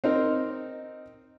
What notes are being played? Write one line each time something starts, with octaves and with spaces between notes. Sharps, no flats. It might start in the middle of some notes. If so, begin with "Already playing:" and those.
C4 D#4 A#4